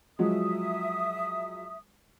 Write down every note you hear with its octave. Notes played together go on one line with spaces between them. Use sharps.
F3 F#3 G#3 E5 D#6